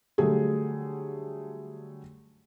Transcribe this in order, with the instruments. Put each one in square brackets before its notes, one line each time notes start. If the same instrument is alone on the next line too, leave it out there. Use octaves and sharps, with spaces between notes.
[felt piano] D3 F#3 G3 A3 G#4